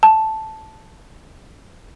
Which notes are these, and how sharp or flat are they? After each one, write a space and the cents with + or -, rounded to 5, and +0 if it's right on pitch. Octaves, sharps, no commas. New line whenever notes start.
A5 -5